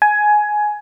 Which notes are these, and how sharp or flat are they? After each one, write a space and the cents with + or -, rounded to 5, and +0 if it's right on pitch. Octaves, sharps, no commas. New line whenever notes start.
G#5 +15